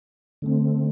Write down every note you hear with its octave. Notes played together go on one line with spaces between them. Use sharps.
D3 A3 C4